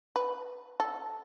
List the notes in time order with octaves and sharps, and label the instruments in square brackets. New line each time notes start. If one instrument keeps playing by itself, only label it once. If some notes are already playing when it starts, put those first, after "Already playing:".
[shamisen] B4
A4